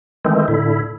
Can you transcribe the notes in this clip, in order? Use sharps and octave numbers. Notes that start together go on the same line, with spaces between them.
D#3 E3 G#3 A3 C4
A2 D3 E4